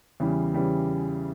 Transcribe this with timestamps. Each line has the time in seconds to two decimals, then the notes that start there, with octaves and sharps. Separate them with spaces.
0.20 E2 C#3 E3 G3
0.54 C#3 E3 G3